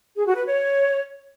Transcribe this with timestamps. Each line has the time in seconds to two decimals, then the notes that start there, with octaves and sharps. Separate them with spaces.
0.16 G#4
0.26 F#4
0.36 B4
0.46 C#5